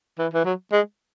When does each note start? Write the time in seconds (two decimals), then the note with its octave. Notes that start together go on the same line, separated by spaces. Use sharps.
0.19 E3
0.34 E3
0.45 F#3
0.72 G#3